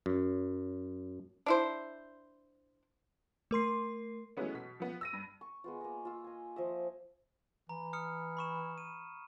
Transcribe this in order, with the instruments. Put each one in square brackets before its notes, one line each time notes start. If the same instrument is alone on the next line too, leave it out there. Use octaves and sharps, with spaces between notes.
[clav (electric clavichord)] F#2
[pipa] D4 E4 C5
[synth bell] A3 A#4 C6 C7
[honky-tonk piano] E3 F#3 G#3 A3 B3 C#4
B2 B6
F3 B3
E6 A#6 D#7
G2
[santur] C#6
G#3 B3 F4
A#3 D#5
F4 E6
D#5 G#5
F3 D#5 E5
[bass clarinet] E3 [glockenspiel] A#5
[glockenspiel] D#6 F6 C#7
B5 C#6 E7
D#7